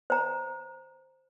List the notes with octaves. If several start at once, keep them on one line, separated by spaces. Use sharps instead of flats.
C5 A#5